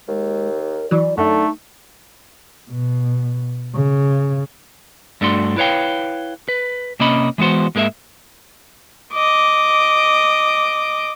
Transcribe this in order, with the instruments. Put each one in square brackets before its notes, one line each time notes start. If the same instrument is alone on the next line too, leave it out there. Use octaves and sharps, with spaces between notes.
[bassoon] D#2 [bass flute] G#3
[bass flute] A#4
[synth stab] E3 F#3 [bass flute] D5
[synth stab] F#2 [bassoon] D3 [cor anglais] A3 [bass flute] D#4
[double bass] B2
C#3
[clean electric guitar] G2 A3 D4 F#4 C6
E4 B4 C#5 F5 G5
B4
C3 A#3 C#4 D#5 B5
E3 G#3 B3 F#4 C5
G#2 G#3 A#3 A#4 E5
[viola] D#5 D6